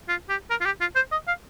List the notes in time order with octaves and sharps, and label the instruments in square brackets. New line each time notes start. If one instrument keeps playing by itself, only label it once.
[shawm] F4
G4
A#4
F4
G4
F4
C5
D#5
F5